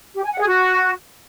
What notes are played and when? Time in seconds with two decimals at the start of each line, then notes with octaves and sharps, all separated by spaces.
0.15 G4
0.23 G#5
0.31 F#5
0.39 G#4
0.47 F#4